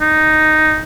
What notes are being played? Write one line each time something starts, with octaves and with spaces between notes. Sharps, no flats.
D#4